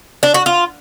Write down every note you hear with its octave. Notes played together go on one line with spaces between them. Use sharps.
D4
F#4
F4